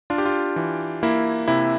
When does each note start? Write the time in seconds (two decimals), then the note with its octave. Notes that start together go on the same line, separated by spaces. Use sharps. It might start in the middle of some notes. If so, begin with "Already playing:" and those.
0.10 D4 F4
0.18 G4
0.25 F4
0.56 E3
1.03 A#3 E4
1.48 C3 E4